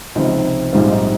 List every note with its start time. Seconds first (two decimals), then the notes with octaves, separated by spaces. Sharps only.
0.15 C#2 C3 F3 C4 D#4
0.73 A#1 G#2 G3 C4 F4
0.91 D#4